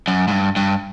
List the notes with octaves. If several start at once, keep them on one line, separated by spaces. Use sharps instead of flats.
F#2
G#2
G2
G2